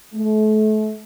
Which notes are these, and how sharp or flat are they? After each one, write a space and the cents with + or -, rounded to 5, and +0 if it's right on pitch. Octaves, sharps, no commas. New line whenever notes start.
A3 -35